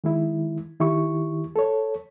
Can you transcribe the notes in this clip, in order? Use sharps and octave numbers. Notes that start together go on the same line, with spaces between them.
D#3 G#3 E4
D#3 E4 G4 C#6
A4 C#5